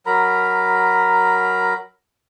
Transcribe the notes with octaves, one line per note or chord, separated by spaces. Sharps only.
F#3 A#4 A#5 B5